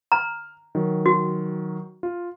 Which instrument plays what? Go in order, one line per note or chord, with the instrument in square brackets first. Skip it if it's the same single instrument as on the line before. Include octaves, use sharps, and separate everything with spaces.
[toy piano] A#5 [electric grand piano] F6
[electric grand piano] D#3 F#3
[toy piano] F#4
[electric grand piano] F4